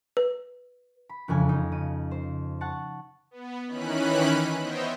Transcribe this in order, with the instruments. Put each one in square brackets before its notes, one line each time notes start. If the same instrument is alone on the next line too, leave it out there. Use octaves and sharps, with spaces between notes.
[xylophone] B4
[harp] B5
E1 F2 C#3 G#5
D#4
C#3 D#7
C5
F#5 A5 C#6
[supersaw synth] B3
D#3 E3 C#4 B5 F#6
B3 C5 C#5 D#5 E5 G5